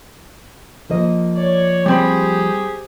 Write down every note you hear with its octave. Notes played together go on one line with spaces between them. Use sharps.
F3 A#3 D#5
C#5 D5
G3 C4 G4 G#4 C5 B5